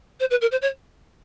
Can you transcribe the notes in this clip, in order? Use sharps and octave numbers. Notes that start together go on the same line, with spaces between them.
C5
B4
A#4
C5
C#5